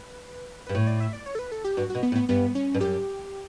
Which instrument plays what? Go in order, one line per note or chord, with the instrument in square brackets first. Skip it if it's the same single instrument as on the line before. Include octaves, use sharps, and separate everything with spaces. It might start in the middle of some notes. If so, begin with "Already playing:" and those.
Already playing: [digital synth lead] B4
B4
[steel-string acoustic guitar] G2
[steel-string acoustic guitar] A2 [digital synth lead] C#5
[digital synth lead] D5
E5
D5
C#5
A4
B4
A4
G4
[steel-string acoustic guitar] G2 [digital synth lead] F#4
[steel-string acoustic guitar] B2 [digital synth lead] F#4
[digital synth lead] B3
[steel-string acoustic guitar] A2
[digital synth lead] B3
[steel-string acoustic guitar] G2 [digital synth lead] B3
[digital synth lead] C#4
[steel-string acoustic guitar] G2
[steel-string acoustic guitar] F#2 [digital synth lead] G4